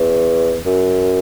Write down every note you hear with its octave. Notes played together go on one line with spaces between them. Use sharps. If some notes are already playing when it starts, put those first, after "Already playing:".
Already playing: E2
F#2